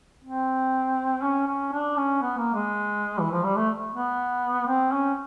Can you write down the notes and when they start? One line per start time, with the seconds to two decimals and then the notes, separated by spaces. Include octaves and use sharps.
0.24 C4
1.22 C#4
1.47 C#4
1.72 D4
1.97 C#4
2.22 B3
2.37 A#3
2.54 G#3
3.20 E3
3.32 F3
3.44 G3
3.56 A3
3.94 B3
4.67 C4
4.92 C#4